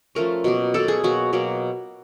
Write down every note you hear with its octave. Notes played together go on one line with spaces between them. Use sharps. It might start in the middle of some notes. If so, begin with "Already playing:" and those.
F3 A3 C#4 A#4
B2 F#3 A#3
B2 F#3 A#3 A4
G#4
B2 F#3 A#3 F#4
B2 F#3 A#3